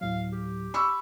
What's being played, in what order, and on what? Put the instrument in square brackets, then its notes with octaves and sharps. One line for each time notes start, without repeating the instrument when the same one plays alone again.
[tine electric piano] D2 A2 F#3 [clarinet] F5
[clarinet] G4
[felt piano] B5 C#6 E6